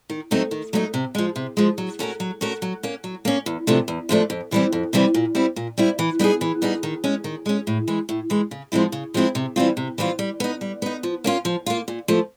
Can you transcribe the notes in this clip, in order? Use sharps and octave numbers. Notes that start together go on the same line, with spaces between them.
D#3
F#3 A3 C4 D#4
D#3
F#3 A3 C4 D#4
C3
F3 G#3
C3
F3 G#3
F#3
A3 C#4 F#4 A#4
F#3
A3 C#4 F#4 A#4
F#3
A#3 C#4
F#3
A#3 C#4
E2
C3 F3 A3 D4
E2
C3 F3 A3 D4
F2
C3 E3 G3 C4
F2
C3 E3 G3 C4
A#2
G3 C4 E4
A#2
G3 C4 E4
E3
G3 B3 D#4 G#4
E3
G3 B3 D#4 G#4
D#3
G#3 C#4
D#3
G#3 C#4
A2
E3 G#3
A2
E3 G#3
C#3
F3 G#3 C4 E4
C#3
F3 G#3 C4 E4
C3
E3 G3 C4 F4
C3
E3 G3 C4 F4
G3
B3 D#4
G3
B3 D#4
F3
A#3 C#4 F4
F3
A#3 C#4 F4
A#2
F3 A3